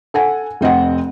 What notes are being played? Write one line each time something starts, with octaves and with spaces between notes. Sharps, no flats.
A4 F#5 G#5
F1 C4 D#5 F#5